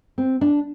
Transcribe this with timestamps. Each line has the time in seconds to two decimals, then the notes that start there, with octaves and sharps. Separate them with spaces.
0.18 C4
0.41 D4